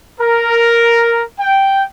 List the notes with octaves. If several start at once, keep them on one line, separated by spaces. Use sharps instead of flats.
A#4
G5